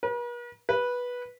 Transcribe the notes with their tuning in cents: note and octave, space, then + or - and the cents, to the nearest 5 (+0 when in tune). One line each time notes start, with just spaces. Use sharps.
B4 -45
B4 -10